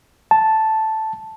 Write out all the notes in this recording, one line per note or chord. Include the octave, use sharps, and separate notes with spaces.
A5